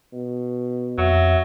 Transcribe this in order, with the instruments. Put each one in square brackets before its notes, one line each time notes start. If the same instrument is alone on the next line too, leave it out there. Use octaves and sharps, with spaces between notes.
[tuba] B2
[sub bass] F2 [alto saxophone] F#3 [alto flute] E5